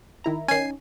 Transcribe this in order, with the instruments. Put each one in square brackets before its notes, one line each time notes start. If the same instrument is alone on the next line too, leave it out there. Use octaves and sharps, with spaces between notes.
[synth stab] D#3 E4 A#5
[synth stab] D#3 C#4 [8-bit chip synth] G#5 C7